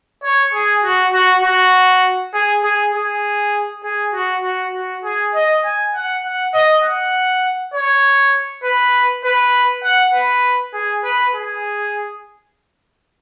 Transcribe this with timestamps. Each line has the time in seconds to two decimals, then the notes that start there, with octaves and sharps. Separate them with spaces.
0.23 C#5
0.54 G#4
0.84 F#4
1.13 F#4
1.44 F#4
2.34 G#4
2.63 G#4
2.94 G#4
3.84 G#4
4.14 F#4
4.44 F#4
4.74 F#4
5.04 G#4
5.34 D#5
5.64 G#5
5.94 F#5
6.24 F#5
6.54 D#5
6.84 F#5
7.74 C#5
8.64 B4
9.24 B4
9.84 F#5
10.14 B4
10.74 G#4
11.03 B4
11.34 G#4